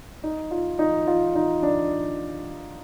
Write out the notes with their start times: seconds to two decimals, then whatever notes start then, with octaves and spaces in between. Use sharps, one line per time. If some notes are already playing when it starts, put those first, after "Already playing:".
0.23 D#4
0.51 F4
0.79 D#4
1.07 F4
1.35 D#4
1.63 D4